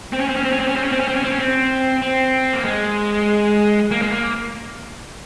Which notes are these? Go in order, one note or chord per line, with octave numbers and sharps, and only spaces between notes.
C4
C#4
C4
C#4
C4
C#4
C4
C#4
C4
C#4
C4
C#4
C4
C#4
C4
C#4
C4
C4
A#3
G#3
A#3
G#3
A#3